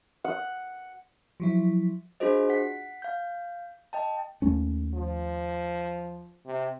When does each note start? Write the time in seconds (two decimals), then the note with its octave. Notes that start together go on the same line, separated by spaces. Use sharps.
0.24 F#5
1.40 F3 F#3 E4
2.20 D4 F4 F#4 G#4 C5 D#5
2.49 F#5 B6
3.02 F5 G6
3.93 D#5 G5 A5
4.42 D#2 A3 C#4
4.94 F3
6.46 C3